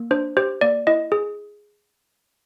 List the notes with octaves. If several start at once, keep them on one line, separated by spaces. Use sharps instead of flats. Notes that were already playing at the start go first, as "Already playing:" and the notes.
Already playing: A#3
D4 C5
G4 C5
A#3 D5
E4 D#5
G#4